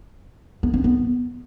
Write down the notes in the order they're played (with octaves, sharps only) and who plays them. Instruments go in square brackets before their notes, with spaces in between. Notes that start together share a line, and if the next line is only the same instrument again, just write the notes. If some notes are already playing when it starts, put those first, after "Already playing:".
[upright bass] B3
C4
B3